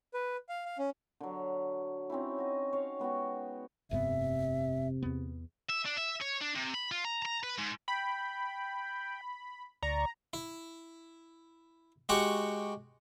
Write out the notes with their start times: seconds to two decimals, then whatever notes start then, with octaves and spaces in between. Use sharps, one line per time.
0.14 B4
0.49 F5
0.66 F5
0.78 C#4
1.20 D3 F#3
2.10 C4 C#4 D#4 E4
2.38 F#4 D#5
2.73 C#5 F5
2.99 G#3 B3 F#4 G5
3.91 F1 G2 C3 B3 E5
5.03 E2 B3
5.70 E5
5.86 D4
5.98 E5
6.22 C#5
6.42 D4
6.56 C3
6.75 B5
6.92 F4
7.05 A#5
7.25 A#5
7.43 B4
7.58 G#2
7.88 G5 B5
9.83 D2 D5 A#5 C#6
10.33 E4
12.09 G#3 F#4 G4 F#5 C#6